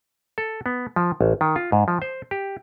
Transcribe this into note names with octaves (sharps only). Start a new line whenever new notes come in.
A4
B3
F3
A1
D#3
F4
G#2
F3
C5
G4